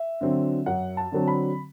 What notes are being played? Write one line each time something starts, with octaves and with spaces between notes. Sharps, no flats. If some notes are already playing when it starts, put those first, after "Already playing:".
Already playing: E5
D3 F#3 C4
F#2 F#5
A5
D3 F#3 C4
B5